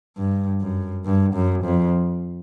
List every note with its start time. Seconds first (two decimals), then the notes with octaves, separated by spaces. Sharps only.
0.17 G2
0.61 F#2
1.05 G2
1.35 F#2
1.64 F2